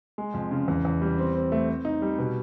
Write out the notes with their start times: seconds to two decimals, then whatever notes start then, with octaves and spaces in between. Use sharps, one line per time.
0.18 G#3
0.34 F2
0.51 C#3
0.68 E2
0.85 E2
1.02 G3
1.18 C4
1.35 C4
1.52 A3
1.68 C4
1.85 D#4
2.02 G3
2.18 B2